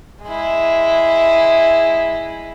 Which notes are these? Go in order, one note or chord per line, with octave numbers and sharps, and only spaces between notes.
G#3 E4